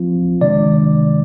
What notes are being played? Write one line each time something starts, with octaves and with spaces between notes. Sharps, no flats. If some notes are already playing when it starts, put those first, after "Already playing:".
Already playing: F3 C4 F4
C3 D#3 G#3 D4 D5